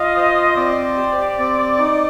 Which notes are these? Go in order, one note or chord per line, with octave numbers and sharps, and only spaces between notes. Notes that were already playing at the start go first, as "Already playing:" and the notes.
Already playing: F4 D#5 F5
C5
C4 D5
G4
C4
D#4